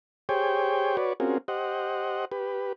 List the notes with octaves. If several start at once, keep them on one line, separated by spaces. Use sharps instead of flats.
G4 G#4 C5 C#5 G5
F#4 B4 C#5 D5
C4 C#4 F4 F#4 G#4 A#4
G4 C5 D#5 F#5
G4 B4